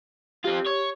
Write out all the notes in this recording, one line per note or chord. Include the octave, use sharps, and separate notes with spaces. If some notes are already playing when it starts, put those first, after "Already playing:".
C4 F4 G4
C#5